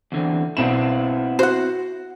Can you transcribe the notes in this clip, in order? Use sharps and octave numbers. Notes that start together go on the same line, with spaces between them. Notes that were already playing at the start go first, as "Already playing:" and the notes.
E2 D3 C4
B1 B3 C4 E4 E7
F#4 C5 F#5